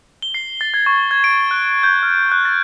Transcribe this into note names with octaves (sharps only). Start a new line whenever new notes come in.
G7
C7
A6
G#6
C#6
G#6
D7
F#6
G6
F6
F#6
A6